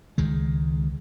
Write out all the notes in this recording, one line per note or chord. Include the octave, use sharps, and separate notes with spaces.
C#2 D#3 G#3